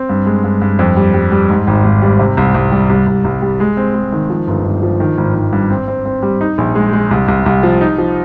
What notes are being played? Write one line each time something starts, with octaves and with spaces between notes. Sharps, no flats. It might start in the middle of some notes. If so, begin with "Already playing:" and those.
Already playing: C4
G2
G#3
G2
G2
F2
G3
G3
G3
G#2
G#1
G#1
G3
C3
C2
C2
G3
C2
C2
C2
G3
G#3
C4
G#3
D#3
F3
G1
G1
F3
D#3
G#1
G#1
G2
C4
C4
C4
G3
D#4
A#1
G#3
G#3
C2
C2
C2
F3
D#4
F3